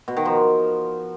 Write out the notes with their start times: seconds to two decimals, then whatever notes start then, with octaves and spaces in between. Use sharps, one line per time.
0.08 B2
0.17 D#3
0.25 F3